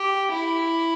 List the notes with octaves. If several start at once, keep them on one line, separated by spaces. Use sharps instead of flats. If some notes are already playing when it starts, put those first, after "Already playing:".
Already playing: G4
E4